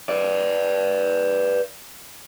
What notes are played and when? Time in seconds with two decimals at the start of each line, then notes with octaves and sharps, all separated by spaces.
0.09 B4 D5